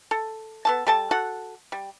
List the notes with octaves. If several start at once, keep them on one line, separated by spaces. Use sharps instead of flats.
A4
B3 A4 A5
G3 A4 A5
F#4 A4 F#5
G3